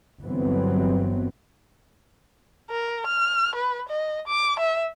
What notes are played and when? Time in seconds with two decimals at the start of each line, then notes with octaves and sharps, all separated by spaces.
0.22 G1 E3 F#3 B3 C4
2.70 A#4
3.07 F6
3.55 B4
3.88 D#5
4.27 D6
4.59 E5